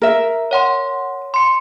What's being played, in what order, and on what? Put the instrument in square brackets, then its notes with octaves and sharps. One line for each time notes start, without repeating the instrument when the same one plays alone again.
[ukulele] A#4 E5
[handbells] C#5 F#5 C6
C6 C#7